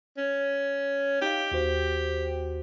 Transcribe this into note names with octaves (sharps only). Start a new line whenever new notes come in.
C#4
D#4 G4 F5
D#2 F#4 C5